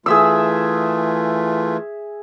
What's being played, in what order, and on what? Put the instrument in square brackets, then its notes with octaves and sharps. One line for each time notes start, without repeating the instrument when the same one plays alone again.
[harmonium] E3 A3 F4 [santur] G#4 E5 E6